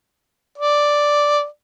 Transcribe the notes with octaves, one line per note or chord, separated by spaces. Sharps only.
D5